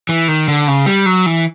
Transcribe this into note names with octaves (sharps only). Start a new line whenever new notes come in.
E3
D#3
D3
C#3
G3
F#3
E3